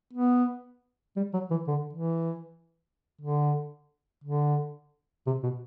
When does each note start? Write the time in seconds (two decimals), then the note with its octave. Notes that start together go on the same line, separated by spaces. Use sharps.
0.13 B3
1.16 G3
1.33 F#3
1.50 E3
1.67 D3
1.93 E3
3.21 D3
4.24 D3
5.26 C3
5.43 B2